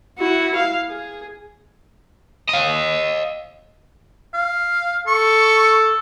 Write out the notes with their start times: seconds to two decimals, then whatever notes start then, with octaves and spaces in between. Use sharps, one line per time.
0.19 E4 F#4
0.56 F5
0.89 G#4
2.49 D#5 F5
4.33 F5
5.07 A4 C#6